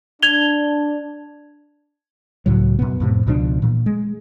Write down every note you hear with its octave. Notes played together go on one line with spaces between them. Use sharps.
D4 G#6 F7 G7
C#2 A2 F#3
F#2 B2 B3
F2 A2 C3
C#2 B2 F3 D4
A#2 E3
G#3